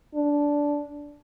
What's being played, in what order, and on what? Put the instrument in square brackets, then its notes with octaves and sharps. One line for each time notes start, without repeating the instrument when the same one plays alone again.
[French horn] D4